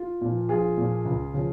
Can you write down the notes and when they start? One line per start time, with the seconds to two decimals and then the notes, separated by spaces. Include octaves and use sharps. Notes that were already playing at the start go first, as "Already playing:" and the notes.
Already playing: F4
0.21 A#2 F3
0.49 A#1 F4 G#4
0.77 A#2 F3
1.05 C#2
1.34 C#3 F3